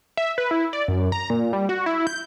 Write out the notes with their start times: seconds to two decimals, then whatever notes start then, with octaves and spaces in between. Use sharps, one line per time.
0.17 E5
0.38 B4
0.51 E4
0.73 D5
0.88 F#2
1.12 A#5
1.30 A#2
1.53 G3
1.69 F#4
1.86 E4
2.07 G6